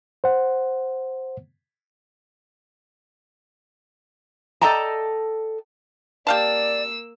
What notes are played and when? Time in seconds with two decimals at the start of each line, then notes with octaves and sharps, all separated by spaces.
0.24 C5 F#5
4.61 A4 D5 D#5 G5 A5 A#5
6.27 A#3 G4 D5 F5 A5 E6